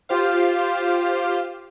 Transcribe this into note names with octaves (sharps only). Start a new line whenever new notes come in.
F4 G4 C5 F5